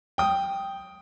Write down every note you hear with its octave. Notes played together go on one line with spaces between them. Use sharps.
G5 D#6